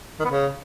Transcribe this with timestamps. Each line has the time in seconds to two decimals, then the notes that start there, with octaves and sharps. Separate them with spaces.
0.20 D#3
0.25 B3
0.30 C#3